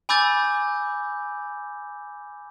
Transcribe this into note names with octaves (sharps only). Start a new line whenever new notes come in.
G#5 B5 D6 E6 G6 A6